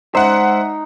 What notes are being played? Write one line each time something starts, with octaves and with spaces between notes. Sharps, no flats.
G#3 D#4 C5 E5 F#5